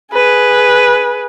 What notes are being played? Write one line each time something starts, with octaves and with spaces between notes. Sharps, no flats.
G#4 B4